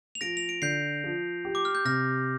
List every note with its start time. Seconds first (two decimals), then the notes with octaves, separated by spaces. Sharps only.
0.15 F7
0.21 F3 A#6 D7
0.37 F7
0.49 D7
0.62 D3 G6 C7
1.04 F3
1.45 G4
1.55 D6
1.65 F6
1.75 G6
1.85 C3 F6 A#6